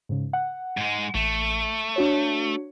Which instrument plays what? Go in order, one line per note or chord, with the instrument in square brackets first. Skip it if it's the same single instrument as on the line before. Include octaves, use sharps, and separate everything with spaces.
[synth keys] G#2 C#3
F#5
[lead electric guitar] G#2 G#3
[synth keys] A1 [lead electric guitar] A3
[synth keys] D4 F#4 C#5